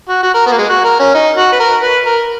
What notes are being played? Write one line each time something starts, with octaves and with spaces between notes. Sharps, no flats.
F#4
F#4
A#4
B3
A#3
G#3
F#4
A#4
C#4
D#4
F#4
B4
A#4
B4
A#4